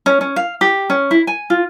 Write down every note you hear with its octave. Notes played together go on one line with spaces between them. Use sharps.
C#4
C#4
F5
G4
C#4
E4
G#5
F4